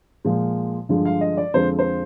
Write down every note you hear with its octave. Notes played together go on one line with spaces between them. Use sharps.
A#2 F3 G#3
G2 D3 F3 G#3
F5
D#5
D5
F2 D3 F3 G#3 C5
C5